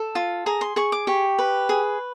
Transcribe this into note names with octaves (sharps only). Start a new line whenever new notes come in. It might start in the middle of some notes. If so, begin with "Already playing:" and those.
Already playing: A4
F4
G#4 A#5
C6
G#4 C#6
D6
G4 C#6
B4
G#4